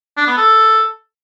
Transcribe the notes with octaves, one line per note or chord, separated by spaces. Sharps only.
D4
B3
A4